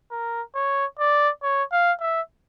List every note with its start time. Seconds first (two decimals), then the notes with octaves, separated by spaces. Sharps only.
0.11 A#4
0.55 C#5
0.99 D5
1.43 C#5
1.72 F5
2.01 E5